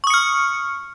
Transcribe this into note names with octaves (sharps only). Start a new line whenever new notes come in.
C#6 D#6 F6 C#7